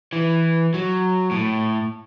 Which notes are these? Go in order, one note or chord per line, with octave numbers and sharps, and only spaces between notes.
E3
F#3
A2